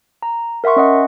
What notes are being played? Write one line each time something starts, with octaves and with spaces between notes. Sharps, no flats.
A#5
A#4 E5 F#5 C6 C#6
C#4 D#5 F#5